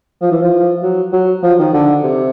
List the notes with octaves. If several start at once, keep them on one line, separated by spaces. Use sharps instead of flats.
F3
E3
F3
F#3
F#3
F3
D#3
D3
C3